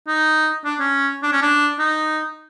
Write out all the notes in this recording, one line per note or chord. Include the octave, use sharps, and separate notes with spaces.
D#4
D4
C#4
D4
C#4
D4
D#4